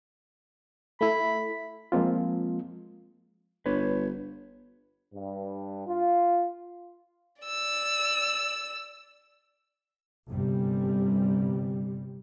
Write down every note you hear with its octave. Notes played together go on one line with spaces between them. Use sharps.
A3 E4 B5
F3 G#3 A#3 C4 F4
G1 B4 C#5
G2
F4
D5 E6
G1 C3 G3